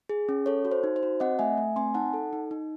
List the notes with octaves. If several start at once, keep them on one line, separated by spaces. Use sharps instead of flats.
G#4
C#4
A4 C#5
F#4
C5
D#4
C5
F#4
C4 D#5 F#5
A3 E5 G#5
A3
C4 G#5 C6
D#4 F#5 A5
A4
D#4
D#4